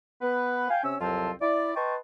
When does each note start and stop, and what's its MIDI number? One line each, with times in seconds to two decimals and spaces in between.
0.22 0.69 59
0.22 0.69 71
0.70 0.80 77
0.70 0.80 79
0.70 0.80 80
0.84 0.95 48
0.84 0.95 61
0.84 0.95 73
0.84 0.95 88
1.01 1.31 36
1.01 1.31 41
1.01 1.31 54
1.01 1.31 60
1.01 1.31 65
1.01 1.31 81
1.41 1.74 64
1.41 1.74 74
1.76 1.96 71
1.76 1.96 75
1.76 1.96 79
1.76 1.96 81
1.76 1.96 84
1.76 1.96 85